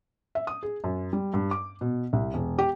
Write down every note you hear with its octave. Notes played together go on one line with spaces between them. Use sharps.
E5
D#6
G#4
F#2
G3
G2
D6
B2
C2
E1
G4